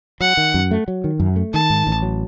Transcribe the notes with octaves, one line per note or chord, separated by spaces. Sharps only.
F#3 F#5
D#3
F#2
A3
F#3
D#3
F#2
A3
D#3 A5
G#2
A1
F#3